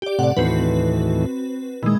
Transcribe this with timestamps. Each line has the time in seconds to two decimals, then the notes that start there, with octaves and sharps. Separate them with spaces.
0.02 G4 D5
0.19 A2 C3 D5 F#5
0.37 D#2 A2 E3 C4 F#4 B4
1.83 A#2 D#3 E3 G#3